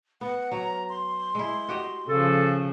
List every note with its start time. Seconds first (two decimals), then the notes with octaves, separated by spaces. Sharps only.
0.21 B3 F#5
0.52 F#3 A#5
0.89 C6
1.35 G#3 E4
1.69 F#4 G4 D#5
2.08 C#3 F3 A4